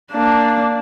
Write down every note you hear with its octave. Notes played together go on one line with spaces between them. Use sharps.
A#3 D4